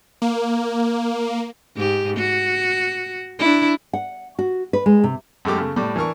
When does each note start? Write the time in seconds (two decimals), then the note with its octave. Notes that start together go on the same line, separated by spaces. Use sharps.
0.22 A#3
1.76 G#2 G4
2.17 F#4
3.39 D4 E4
3.93 F#5
4.39 F#4
4.73 B4
4.86 G#3
5.04 C3
5.45 F#2 G#3 A3 G4 D6
5.58 C#3 A3
5.76 A2 G3 D6
5.96 E3 D4 A#4 C#6